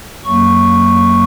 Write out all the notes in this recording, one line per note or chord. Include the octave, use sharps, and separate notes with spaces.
F#2 F#3 A#3 C#6